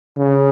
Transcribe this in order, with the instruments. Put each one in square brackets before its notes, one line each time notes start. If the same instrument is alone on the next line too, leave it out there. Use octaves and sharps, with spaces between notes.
[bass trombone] C#3